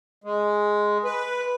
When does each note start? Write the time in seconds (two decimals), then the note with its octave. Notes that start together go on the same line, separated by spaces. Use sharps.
0.24 G#3
1.04 B4